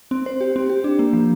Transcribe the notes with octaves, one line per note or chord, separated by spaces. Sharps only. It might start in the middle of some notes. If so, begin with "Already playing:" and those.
C4
C5
G4
C4
G4
D4
A#3
F3